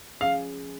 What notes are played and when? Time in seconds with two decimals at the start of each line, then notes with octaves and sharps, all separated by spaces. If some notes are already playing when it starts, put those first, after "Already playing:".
0.21 F3 C#4 G#4 F5